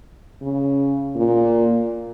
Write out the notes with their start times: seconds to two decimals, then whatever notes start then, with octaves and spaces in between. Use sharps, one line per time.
0.42 C#3
1.16 A#2